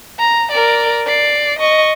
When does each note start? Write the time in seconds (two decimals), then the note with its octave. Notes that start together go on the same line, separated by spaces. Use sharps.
0.19 A#5
0.52 A#4 D5
1.07 D5 C7
1.59 D#5 C#6